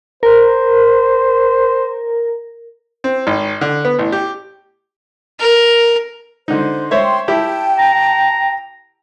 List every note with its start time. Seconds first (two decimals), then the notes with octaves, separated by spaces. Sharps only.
0.23 A#4 C5
3.04 C4
3.27 G#1
3.61 D3
3.85 B3
3.99 A1
4.12 G4
5.39 A#4
6.48 D3 D#4 C5
6.91 C5 C#5 E5 G5 C6
7.28 E4 G4 G5 A5
7.79 A#5